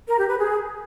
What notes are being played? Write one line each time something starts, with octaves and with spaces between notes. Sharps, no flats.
A#4
G4
B4
G#4